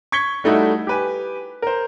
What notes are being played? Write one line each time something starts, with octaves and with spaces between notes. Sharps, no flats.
C#6 G#6 B6 C#7 G7
G3 A3 D#4 E4 F#4
G4 B4 G#5
A#4 C5